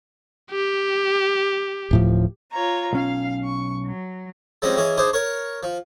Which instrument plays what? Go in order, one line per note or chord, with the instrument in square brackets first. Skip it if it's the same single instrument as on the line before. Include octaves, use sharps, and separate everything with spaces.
[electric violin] G4
[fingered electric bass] D1 A2 F3
[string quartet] F4 C#5 A#5
[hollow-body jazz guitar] B1 C#4 [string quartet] F5
[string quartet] C#6
F#3
[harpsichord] F3 G3 G#3 C4 C#4 D#5
E3 C#4 G#4 D#5
D4 D#4 G#4 C5
A#4 C#5 C#6
F3